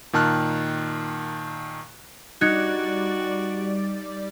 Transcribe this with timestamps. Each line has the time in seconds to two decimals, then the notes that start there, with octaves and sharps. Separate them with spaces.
0.13 A#2 D#3 A5 F6 F#6
2.41 G3 D#4 F#4 D5 F#6 G#6 C#7